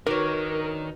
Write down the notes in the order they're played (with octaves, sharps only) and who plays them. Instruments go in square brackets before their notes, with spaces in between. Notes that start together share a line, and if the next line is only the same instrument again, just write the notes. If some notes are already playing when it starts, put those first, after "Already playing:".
[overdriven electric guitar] D#3 [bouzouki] D4 C#5 [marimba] D#4 F#4 B4 [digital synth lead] A#4